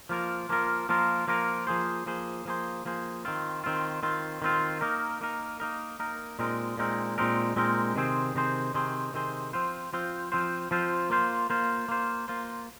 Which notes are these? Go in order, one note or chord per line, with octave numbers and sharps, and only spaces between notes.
F3 A#3 F4 A#4
F3 A#3 F4 A#4
F3 A#3 F4 A#4
F3 A#3 F4 A#4
F3 A#3 G#4 C5
F3 A#3 G#4 C5
F3 A#3 G#4 C5
F3 A#3 G#4 C5
D#3 C4 F4
D#3 C4 F4
D#3 C4 F4
D#3 C4 F4
A#3 D#4 A#4
A#3 D#4 A#4
A#3 D#4 A#4
A#3 D#4 A#4
A#2 G#3 C4 D#4 A#4
A#2 G#3 C4 D#4 A#4
A#2 G#3 C4 D#4 A#4
A#2 G#3 C4 D#4 A#4
C3 D#3 C4 G#4 C5
C3 D#3 C4 G#4 C5
C3 D#3 C4 G#4 C5
C3 D#3 C4 G#4 C5
F3 C4 F4 C5
F3 C4 F4 C5
F3 C4 F4 C5
F3 C4 F4 C5
A#3 F4 C5
A#3 F4 C5
A#3 F4 C5
A#3 F4 C5